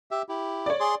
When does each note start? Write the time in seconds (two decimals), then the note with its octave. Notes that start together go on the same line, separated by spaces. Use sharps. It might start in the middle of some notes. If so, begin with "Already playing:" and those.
0.11 G4 E5
0.29 E4 G4
0.66 C#5 D5
0.80 G#4 C6